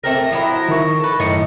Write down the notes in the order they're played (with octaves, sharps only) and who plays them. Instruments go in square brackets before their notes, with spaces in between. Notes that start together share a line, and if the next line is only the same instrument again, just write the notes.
[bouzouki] A3 C4 A#4 [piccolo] A#6
[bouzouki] F3 F#3 E4
[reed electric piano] D#3 A#4 C#6
[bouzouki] A4 B4
[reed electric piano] F#2 [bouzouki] A2 D#4 [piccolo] C#7